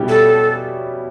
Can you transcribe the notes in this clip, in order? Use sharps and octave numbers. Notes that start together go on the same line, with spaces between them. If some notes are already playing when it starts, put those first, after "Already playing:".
Already playing: B2 G3 C#4 E4 G4
A4